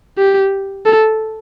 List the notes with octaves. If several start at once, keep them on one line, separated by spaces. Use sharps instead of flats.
G4
A4